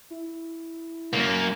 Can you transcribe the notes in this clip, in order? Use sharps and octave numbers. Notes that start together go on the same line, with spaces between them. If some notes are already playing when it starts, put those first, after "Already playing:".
E4
C#2 F#2 A#3